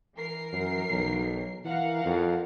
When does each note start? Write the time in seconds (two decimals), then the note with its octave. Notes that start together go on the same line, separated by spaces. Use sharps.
0.15 E3 A#4 C7
0.53 F#2
0.90 B1
1.65 E3 A#4 F5 F#5
2.05 F2